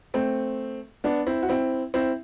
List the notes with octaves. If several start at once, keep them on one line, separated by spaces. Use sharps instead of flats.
A3 C4
B3 D4
C4 E4
F#4
C4 E4
C4 E4